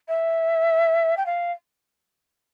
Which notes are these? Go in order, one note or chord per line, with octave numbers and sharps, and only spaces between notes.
E5
G5
F5